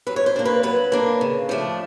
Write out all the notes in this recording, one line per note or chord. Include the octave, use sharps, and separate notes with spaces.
F#3 B4
C#5
C5
A#3 D4
B4
F#3 B4
A#3 D4
C#3
F3 A3 D4